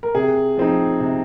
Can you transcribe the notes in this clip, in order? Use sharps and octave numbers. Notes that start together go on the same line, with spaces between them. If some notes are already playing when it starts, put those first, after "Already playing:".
A#4
C3 G#4
F3 C4 D#4
C3